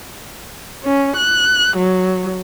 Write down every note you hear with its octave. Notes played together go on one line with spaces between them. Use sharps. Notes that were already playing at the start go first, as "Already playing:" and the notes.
C#4
F#6
F#3